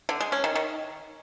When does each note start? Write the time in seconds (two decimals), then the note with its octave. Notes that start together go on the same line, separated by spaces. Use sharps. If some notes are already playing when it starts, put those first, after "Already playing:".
0.09 D3
0.21 G#3
0.32 C#4
0.44 D#3
0.55 D#3